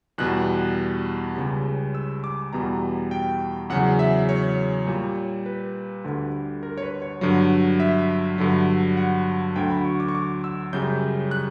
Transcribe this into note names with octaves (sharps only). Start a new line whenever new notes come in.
E2 B2 G3 F#6
C#2 C#3 G3
E6
D6
E2 B2 G3 A#5
G5
E2 C#3 F#3 F#5
E5
C#5
A#2 G3
B4
D2 D3 G3
A#4
C#5
B4
C#5
G2 D3 F#3
E5
G2 D3 F#3
F#5
D2 D3 F#3 G5
B5
C#6
D6
C#6
D6
E6
F#2 C#3 G3 G6
F#6